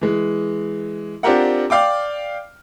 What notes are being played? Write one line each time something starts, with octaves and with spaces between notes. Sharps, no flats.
E3 G#3
C4 D4 F4 G4 A#4 F#5
D5 F5 G5 D6